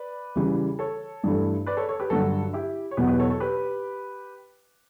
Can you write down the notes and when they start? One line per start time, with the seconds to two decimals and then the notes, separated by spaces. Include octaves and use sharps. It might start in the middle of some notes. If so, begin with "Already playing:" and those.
Already playing: B4 D5
0.36 C#3 E3 G3
0.79 A4 C#5
1.24 G2 E3 A3
1.66 B4 D5
1.77 A4 C#5
1.89 A4 C#5
2.00 G4 B4
2.10 G2 D3 F#3 F#4 A4
2.53 E4 G4
2.91 C#5
2.97 E2 B2 F#3 G4 B4
3.08 G4 B4
3.20 A4 C#5
3.30 A4 C#5
3.40 G4 B4